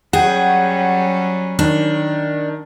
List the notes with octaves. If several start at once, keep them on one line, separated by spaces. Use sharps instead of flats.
F#3 G3 C#4 G#4 F#5 G5
D#3 D4